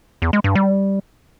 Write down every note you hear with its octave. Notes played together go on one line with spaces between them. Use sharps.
E2
G#3
G2
G3